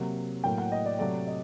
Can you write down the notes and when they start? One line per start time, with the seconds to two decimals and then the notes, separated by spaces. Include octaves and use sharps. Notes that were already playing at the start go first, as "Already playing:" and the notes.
Already playing: C3 F#3 A#3
0.44 A2 F#3 A#3 G5
0.58 F#5
0.72 D#5
0.86 D5
0.99 C3 F#3 A3 D5
1.27 D#5